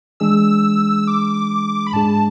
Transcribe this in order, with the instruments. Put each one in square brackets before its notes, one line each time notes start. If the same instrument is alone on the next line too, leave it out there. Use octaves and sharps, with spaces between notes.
[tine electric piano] E3 G#3 D4 G#4 [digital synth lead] E6
[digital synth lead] D6
B5
[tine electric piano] G#2 G#3 D4 G#4 [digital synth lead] A5